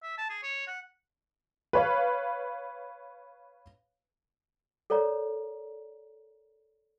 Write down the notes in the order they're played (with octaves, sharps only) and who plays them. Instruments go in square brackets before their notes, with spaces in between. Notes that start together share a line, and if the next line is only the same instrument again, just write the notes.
[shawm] E5
A5
G#4
C#5
F#5
[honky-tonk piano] B4 C#5 F5
[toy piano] A4 A#4 C#5 D5 A#5